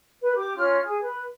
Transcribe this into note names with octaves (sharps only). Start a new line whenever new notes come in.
B4
G4 D6
C#4 F4 F6
G#4
B4